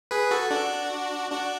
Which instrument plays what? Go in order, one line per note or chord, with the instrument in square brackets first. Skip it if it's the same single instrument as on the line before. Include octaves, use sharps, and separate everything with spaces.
[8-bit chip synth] G#4 B4
F#4 A4
D4 F#4
D4 F#4